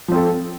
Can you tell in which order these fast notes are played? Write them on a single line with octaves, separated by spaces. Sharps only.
F3 C4 A4